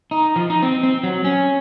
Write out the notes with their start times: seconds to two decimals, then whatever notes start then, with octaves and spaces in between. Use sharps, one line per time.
0.11 D#4
0.36 F3
0.50 D#4
0.62 C4
0.83 C4
1.03 F#3
1.25 C#4